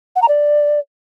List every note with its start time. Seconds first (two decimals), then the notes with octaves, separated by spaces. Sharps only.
0.16 F#5
0.22 A#5
0.28 D5